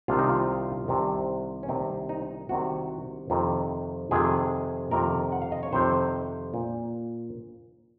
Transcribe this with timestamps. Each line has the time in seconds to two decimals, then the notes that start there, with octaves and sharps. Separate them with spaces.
0.08 C2 C3 D#3 F4
0.19 D#4
0.29 F4
0.88 C2 C3 D#3
1.63 C#4
1.69 C2 C3 D#3 C4
2.09 D#4
2.49 C2 C3 D#3 F#4
3.30 F2 C3 D#3
4.11 F2 C3 D#3 G#4
4.91 F2 C3 D#3 A#4
5.32 F#5
5.42 F5
5.52 D#5
5.63 C#5
5.73 F2 C3 D#3 C5
6.54 A#2